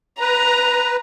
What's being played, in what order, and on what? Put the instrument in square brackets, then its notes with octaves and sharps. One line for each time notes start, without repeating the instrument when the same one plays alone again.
[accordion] B4 [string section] A#5